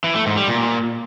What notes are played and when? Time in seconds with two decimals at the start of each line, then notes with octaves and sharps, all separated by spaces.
0.04 E3
0.15 A3
0.26 G#2
0.37 G3
0.48 A#2